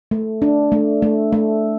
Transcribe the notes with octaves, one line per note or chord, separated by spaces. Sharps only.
A3
D4
A3
A3
A3